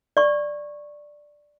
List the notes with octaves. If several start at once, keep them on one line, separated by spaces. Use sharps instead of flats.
D5 C#6